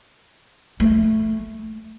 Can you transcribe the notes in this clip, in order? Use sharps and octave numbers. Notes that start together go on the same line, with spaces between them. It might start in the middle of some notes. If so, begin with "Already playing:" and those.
A3